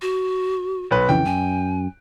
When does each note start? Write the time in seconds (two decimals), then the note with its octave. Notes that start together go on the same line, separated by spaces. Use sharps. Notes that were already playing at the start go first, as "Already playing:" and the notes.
0.02 F#4
0.91 B1 B4
1.09 F2 C#3 E3 G5
1.26 F#2 G#5